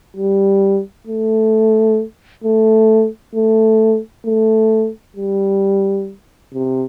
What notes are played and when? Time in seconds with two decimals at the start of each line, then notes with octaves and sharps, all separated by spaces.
0.17 G3
1.07 A3
2.44 A3
3.35 A3
4.26 A3
5.16 G3
6.54 C3